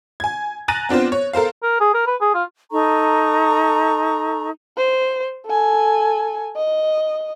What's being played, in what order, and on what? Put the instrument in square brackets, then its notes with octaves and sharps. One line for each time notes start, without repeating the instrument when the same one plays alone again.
[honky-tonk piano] G#5 G#6
G#5 A#5 F#6 A6 A#6 D#7
B3 C4 D4 F4 C5
C#5
A4 A#4 C5 F5
[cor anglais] A#4
G#4
A#4
B4
G#4
F4
[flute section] D#4 A4 A#5 C#6
[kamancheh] C5
A4 G#5
D#5